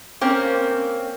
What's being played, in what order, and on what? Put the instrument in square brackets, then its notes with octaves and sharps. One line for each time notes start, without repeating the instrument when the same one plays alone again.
[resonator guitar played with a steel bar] A#3 C4 C#4